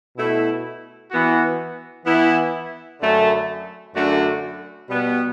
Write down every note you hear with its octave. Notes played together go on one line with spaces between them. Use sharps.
B2 A3 E4
E3 B3 F#4
E3 B3 E4
F#2 D3 A3
F#2 D3 A3 D4 F#4
B2 G3 B3